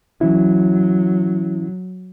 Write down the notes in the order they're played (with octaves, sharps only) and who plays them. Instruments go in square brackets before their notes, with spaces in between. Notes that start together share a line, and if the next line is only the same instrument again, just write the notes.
[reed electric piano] E3 C#4 E4 [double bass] F#3